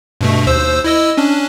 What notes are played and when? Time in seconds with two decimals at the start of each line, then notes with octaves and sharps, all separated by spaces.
0.21 G2 B2 A3
0.47 D#2 C5 E6
0.84 E4 D#5 E6
1.17 C#4 D4